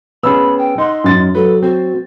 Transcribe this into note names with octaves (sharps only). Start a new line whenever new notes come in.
B3 C#4 G#4 B5 E6
G5
D#4 F#5 C6
F#2 A6
F#3 A4 B4
C4 F#4